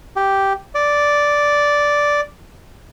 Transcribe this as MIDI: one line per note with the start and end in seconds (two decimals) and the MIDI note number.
0.16 0.53 67
0.75 2.21 74